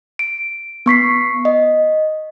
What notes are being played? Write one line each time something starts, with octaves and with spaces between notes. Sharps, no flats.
D7
B3 C#6 B6 C7
D#5